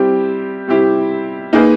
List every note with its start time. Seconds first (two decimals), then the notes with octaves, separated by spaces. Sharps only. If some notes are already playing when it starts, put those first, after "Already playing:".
Already playing: G3 C4 E4 G4
0.68 G3 C4 E4 G4
1.53 A#3 D#4 G#4 B4